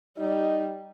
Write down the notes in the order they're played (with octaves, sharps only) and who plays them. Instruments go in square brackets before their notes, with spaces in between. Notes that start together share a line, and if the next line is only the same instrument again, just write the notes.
[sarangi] G3 [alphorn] D#4